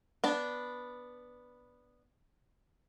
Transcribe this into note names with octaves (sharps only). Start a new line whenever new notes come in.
B3 D4 A5